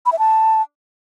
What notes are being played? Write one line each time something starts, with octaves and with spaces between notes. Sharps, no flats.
B5
E5
A5